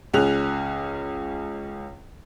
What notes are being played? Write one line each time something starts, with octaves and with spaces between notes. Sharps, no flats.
C#2 C#4 G#4 F#6 F7